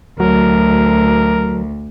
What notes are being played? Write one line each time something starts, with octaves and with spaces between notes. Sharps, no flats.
D2 F#3 A#4